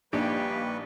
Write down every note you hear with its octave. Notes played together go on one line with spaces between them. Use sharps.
A#1 G3 A#3 D4 D#4 G4 B4 C#6